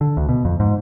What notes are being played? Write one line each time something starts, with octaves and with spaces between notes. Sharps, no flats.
D3
D2
B2
F2
G#2